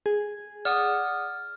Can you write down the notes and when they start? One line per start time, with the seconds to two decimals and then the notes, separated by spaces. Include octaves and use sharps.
0.06 G#4
0.65 D5 F#5 D#6 F6